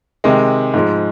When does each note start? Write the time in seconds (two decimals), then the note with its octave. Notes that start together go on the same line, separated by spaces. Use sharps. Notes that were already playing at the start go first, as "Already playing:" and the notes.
0.24 C3 D#3 G#3
0.74 G#2 F3 G#3